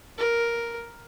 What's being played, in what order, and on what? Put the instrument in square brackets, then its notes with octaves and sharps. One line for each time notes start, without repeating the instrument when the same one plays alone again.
[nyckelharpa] A#4